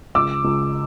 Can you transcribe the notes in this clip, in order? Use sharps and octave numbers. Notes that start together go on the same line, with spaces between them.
C#2 D6 E6
C#2